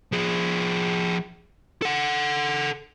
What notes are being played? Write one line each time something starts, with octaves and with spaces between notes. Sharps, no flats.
F3 G#4
A4 F#5